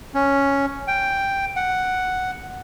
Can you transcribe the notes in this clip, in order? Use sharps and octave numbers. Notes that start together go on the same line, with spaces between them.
C#4
G5
F#5